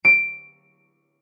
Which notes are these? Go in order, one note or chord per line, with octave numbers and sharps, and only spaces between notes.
D7